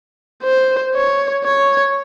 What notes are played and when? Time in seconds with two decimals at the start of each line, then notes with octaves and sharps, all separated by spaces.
0.44 C5
0.95 C#5
1.44 C#5